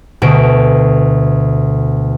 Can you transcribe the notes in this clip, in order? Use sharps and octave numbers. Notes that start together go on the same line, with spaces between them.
D2 B2 D7